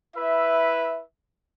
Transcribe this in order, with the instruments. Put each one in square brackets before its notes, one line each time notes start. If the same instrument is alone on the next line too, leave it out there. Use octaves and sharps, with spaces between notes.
[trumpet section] E4 B4 E5